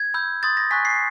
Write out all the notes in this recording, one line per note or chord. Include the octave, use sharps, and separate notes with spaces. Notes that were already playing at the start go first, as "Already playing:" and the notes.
Already playing: G#6
B5 E6 G6
C6 D#6 G6 A6
A#6
G#5 C#6 F#6 B6
C7